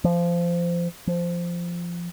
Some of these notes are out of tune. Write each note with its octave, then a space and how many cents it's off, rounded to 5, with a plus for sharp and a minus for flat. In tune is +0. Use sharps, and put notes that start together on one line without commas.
F3 -20
F3 -10